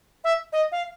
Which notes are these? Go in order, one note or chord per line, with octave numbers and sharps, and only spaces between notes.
E5
D#5
F5